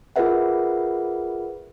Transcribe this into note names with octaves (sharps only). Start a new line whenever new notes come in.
F4 G#4 A#4 B4 E5 F#5